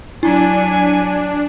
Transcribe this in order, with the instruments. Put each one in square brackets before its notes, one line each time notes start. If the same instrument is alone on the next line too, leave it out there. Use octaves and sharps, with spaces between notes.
[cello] F#3 [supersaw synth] D4 [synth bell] E4 A#5 [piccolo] G#5